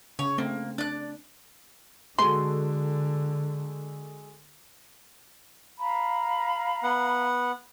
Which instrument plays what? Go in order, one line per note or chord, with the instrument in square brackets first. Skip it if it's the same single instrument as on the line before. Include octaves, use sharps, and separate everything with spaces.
[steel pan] C#3 [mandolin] C#5
[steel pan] A3 C4 [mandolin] A#3
[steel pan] D4 [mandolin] D5 F#6
[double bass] D3 [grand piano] G#3 F#4 A4 [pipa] C6
[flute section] F5 A#5 B5
[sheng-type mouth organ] B3 F#5